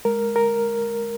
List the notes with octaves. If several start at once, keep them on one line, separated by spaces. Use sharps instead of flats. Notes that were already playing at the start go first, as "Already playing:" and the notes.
G#3 A#4
A#4